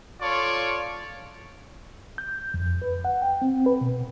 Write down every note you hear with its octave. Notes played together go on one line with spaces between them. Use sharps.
F4 A4 C#5 D5 C#6
G6
F2
B4
F#5
G5
C4
B4
B2